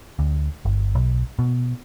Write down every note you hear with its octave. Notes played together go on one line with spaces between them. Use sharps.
D2
G1
B1
B2